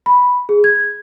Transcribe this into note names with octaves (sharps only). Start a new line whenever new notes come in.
B5
G#4
G#6